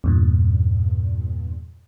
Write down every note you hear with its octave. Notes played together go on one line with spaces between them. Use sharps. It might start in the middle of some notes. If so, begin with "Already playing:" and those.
E2 G2 A#2